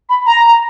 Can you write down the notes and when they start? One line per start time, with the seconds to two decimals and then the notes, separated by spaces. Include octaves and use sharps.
0.09 B5
0.26 A#5